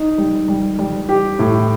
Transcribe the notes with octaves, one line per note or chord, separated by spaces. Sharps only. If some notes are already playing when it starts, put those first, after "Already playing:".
Already playing: D#4
G3
G3
G3
G4
A2